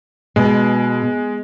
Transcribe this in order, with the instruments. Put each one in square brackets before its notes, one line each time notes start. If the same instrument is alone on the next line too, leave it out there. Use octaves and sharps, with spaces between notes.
[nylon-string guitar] B2 [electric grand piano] G#3